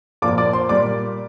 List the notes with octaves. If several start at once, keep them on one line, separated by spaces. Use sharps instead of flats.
A#2 F3 A#3 D5 D6
D5 D6
C5 C6
A#2 G3 A#3 D5 D6